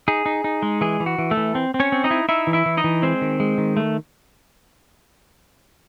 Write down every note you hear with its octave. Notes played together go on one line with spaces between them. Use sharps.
D#4 G#4
D#4
D#4
G#3
E3 G#4
E3
F#4
E3
A3 A4
E3
C4
C4
C#4 C#5
C4
D#4 D#5
E4
D#4 E4 E5
E3
E4 E5
E3
D#4 D#5
E3
G#3 C4 C5
D#3
G#3
D#3
A3